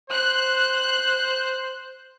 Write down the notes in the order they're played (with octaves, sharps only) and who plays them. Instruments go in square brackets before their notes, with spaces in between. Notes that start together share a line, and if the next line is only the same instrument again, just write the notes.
[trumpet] C5 [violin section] F#6